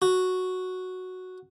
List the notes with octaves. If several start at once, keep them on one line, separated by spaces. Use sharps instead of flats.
F#4